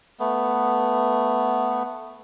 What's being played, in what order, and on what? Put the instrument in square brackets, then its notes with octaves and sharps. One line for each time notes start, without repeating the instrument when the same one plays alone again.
[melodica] A3 B3